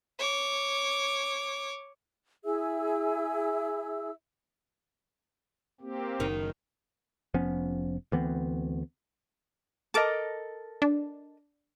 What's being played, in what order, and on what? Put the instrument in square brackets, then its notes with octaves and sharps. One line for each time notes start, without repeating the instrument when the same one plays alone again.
[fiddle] C#5 D6
[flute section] E4 G#4 E5 E6
[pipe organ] A#3 C4 G4
[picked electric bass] F#1 [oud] D#3
[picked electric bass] F1 F3 B3 C#4
D2 E3 B3 C4
[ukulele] A4 A#4 D#5 [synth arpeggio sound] A5 D6
[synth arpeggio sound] D4